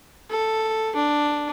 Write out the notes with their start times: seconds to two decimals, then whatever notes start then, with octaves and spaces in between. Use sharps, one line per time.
0.30 A4
0.96 D4